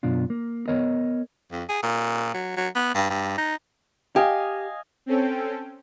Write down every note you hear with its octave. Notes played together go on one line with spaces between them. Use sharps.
F#2 B2 D4 F4
A#3
B3 A#4 C#5 D#5
F2
G#4
A#2
F#3
F#3
B3
G2
G2
D#4
G4 D#5 F5 G#5
C4 C#4 A4 G5